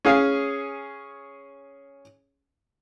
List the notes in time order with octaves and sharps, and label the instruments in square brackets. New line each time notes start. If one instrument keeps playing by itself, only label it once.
[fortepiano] C#4 G#4 F5